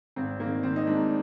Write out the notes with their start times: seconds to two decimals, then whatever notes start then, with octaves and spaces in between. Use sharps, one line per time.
0.16 G#1 C4
0.40 D#3 A#3
0.63 D#3 C4
0.76 D#4
0.87 G#2 D4